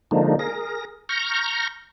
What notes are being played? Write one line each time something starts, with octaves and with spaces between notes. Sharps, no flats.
D3 F3 G#3 A#3 D4 D#4
G#4 A#4 A#6
A#5 C#6 F6 G6 A#6